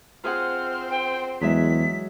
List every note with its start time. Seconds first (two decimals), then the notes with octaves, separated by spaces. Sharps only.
0.24 C4 F4 G#4 C5 F#5 F6
0.89 G5
1.41 E2 F#3 G#3 E5 B6